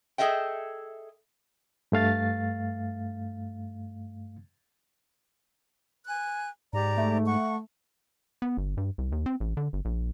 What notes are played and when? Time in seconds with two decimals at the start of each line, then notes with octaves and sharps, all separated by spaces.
0.18 G#4 A4 D#5 E5 G5
1.92 G2 A3 F5 A6
6.07 G#5 F#6
6.73 G#2 G4 D5 A#5
6.97 A3
7.26 F#5 C#6
8.42 B3
8.58 G1
8.77 G2
8.98 C2
9.12 D#2
9.26 C4
9.40 A1
9.57 D3
9.73 G1
9.85 A#1